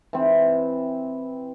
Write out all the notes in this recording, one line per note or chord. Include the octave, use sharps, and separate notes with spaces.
E3 C4